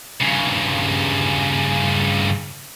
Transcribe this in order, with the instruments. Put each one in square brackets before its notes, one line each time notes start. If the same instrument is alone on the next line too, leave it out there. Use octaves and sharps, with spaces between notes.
[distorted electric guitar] G2 C#3